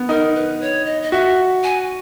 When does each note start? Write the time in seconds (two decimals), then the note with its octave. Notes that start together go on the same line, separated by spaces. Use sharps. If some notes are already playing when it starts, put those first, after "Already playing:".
Already playing: B3
0.09 D#4 A#4
0.35 B4
0.61 C#5
0.86 D#5
1.02 D#5
1.12 F#4 E5
1.63 G#5